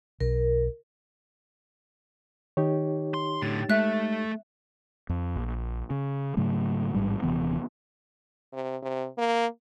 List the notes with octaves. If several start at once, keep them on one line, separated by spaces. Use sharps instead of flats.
B1 A#4
D#3 D#4 G4 C#5
C6
A2 D3 A6
G#3 A3 A4 E5 F#6
F2
A#1
C#3
G#2 C#3 F#3 A3
A1 G#2 G3
D#1 C3 E3 B3
C3
C3
A#3